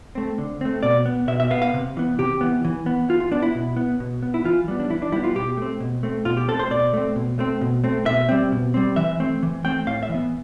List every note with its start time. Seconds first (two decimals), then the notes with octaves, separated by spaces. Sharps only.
0.15 A3 C4
0.38 D3
0.61 A3 C4
0.83 B2 D5
1.06 B3
1.28 B2 E5
1.40 E5
1.51 B3 F5
1.62 F5
1.74 C3
1.97 E3 B3
2.19 C3 G4
2.41 E3 B3
2.65 E3
2.86 B3
3.09 E3 F4
3.20 F4
3.32 B3 D4
3.43 E4
3.55 B2
3.76 B3
4.00 B2
4.23 B3
4.34 E4
4.44 E3 F4
4.68 G3 B3
4.80 D4
4.90 E3 E4
5.02 D4
5.12 G3 E4
5.16 B3
5.24 F4
5.35 B2 G4
5.57 A3 C4
5.80 B2
6.03 A3 C4
6.25 B2 F4
6.37 G4
6.48 C4 A4
6.52 A3
6.59 C5
6.71 B2 D5
6.93 A3 C4
7.16 B2
7.39 A3 C4
7.61 B2
7.84 A3 C4
8.06 B2 E5
8.29 G3 C4
8.52 B2
8.74 G3 C4
8.96 E3 E5
9.20 A3 C4
9.43 E3
9.65 A3 C4 G5
9.87 A2 F5
10.03 E5
10.09 E3
10.14 B3